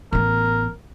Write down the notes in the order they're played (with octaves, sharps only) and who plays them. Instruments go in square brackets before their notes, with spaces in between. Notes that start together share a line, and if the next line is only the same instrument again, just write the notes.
[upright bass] A1 B3 [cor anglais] A#4